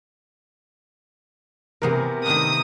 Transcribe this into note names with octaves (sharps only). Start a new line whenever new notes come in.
C3 E3 B3 G#4 A#4
D#3 A3 B3 D#6